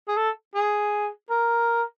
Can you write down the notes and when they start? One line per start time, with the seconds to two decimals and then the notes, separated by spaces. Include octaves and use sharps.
0.08 G#4
0.17 A4
0.55 G#4
1.30 A#4